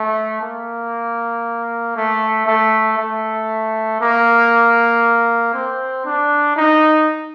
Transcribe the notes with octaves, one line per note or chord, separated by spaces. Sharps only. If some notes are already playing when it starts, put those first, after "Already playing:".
Already playing: A3
A#3
A3
A3
A3
A#3
C4
D4
D#4